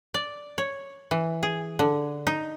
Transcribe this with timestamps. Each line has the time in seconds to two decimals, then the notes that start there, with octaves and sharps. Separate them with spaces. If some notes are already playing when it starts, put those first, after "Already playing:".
0.14 D5
0.58 C#5
1.11 E3
1.43 G#4
1.79 D3
2.27 D#4